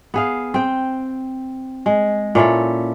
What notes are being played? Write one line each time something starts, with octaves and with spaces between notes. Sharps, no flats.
B3 G#4 F5
C4 G5
G#3
A#2 C#4 E4 A4